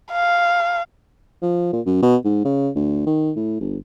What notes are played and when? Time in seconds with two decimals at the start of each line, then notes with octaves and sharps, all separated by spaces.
0.11 F5
1.42 F3
1.73 A#2
1.86 F#2
2.02 B2
2.25 G#2
2.45 C#3
2.76 D2
3.07 D#3
3.36 A2
3.61 G1